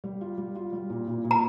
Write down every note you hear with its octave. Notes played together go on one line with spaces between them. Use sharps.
G3
F4
G3
F4
G3
A#2
A#2
A#2
A#5